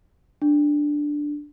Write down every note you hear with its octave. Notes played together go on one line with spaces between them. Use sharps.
D4